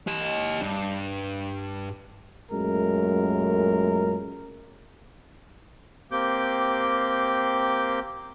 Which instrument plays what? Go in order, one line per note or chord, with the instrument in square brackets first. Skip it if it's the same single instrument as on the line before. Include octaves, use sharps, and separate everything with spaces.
[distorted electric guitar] G4 D#5
G2
[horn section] F#2 A#2 G#3 A3 A#4
[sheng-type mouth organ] A#3 C4 G4 D6 G6